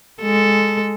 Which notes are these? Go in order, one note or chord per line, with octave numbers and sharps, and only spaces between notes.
G#3 A4